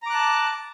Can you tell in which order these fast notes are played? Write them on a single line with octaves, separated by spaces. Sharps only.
A#5 D6 F#6 A5